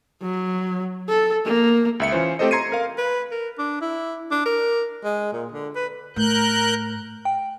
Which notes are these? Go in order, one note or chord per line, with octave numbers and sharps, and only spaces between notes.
F#3
A4
A#3
C#2 E5 C#7
E3 C#4 F4 C5
A3 C4 G4 A4 C5 D#5
A#5 C6 G#6 C7 C#7 D#7
A#4 F5
B4
A#4
D4
E4
D4
A#4
G#3
A#2
D3
B4
A2 A#4 F#6 G6
G5